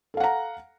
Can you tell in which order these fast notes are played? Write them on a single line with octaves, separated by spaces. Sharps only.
A4 F5 F#5 A#5